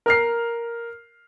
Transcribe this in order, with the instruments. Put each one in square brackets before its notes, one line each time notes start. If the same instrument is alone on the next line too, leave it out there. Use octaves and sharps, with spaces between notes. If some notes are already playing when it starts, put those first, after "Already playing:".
[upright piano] A#4 F6 C7